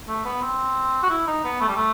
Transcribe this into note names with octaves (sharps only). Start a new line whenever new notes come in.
A3
B3
C4
F#4
E4
D#4
B3
A3
G3
A3